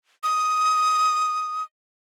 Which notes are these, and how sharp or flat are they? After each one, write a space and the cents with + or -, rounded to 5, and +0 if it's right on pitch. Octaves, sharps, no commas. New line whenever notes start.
D#6 +10